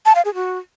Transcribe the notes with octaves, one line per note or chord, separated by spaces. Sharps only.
A5
F5
G#4
F#4